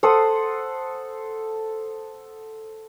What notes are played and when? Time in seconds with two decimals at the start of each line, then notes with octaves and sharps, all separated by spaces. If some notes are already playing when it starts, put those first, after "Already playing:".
0.03 A4 C5 F#5 D#6